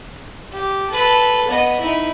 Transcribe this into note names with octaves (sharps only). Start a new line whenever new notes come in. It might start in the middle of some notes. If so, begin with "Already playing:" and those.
G4
A4 B4
B3 D#5
D#4 E4